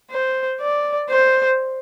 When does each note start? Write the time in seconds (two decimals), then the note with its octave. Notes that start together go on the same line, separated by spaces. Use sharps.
0.11 C5
0.61 D5
1.10 C5